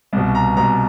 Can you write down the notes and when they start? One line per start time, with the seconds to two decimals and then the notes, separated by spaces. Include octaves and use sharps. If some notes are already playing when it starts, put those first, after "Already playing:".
0.13 C2 B2
0.35 A#5
0.57 C2 B2 A#5